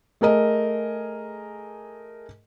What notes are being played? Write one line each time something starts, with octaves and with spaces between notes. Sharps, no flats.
A3 G#4 A#4 D#5